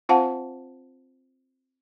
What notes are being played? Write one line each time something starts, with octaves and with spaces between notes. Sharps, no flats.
C4 F4 C5 F5 F#5 A5